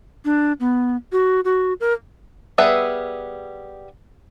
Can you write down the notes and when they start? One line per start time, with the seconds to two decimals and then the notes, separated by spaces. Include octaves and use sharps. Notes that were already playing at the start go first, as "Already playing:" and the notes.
0.25 D4
0.60 B3
1.12 F#4
1.45 F#4
1.80 A#4
2.58 G3 B3 G#4 B4 E5